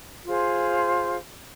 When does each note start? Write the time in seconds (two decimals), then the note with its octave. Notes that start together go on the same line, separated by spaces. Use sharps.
0.25 F4 G#4 C5